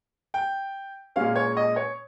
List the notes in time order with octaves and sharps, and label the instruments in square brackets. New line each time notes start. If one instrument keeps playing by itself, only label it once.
[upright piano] G5
A#2 G#3 C#4 F5
C#5
D#5
C#5